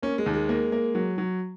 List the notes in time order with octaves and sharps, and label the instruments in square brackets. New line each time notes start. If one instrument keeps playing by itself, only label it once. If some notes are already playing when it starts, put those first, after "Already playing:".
[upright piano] A#3 [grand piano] C#4
[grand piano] G#3
[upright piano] D#2
[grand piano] G#3
[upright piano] A#3
A#3
F#3
F#3